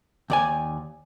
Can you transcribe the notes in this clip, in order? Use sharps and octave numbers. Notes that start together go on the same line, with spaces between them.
D#2 D5 G#5